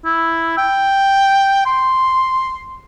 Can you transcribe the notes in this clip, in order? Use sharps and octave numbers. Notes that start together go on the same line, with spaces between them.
E4
G5
C6